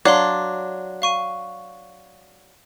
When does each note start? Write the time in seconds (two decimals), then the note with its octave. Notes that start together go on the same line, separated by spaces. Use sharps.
0.05 F#3 D4 F5 C6
1.02 F5 C#6 D#7